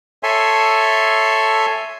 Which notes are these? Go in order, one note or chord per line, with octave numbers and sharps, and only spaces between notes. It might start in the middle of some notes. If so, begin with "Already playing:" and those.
A4 C#5 E5 G#5 C6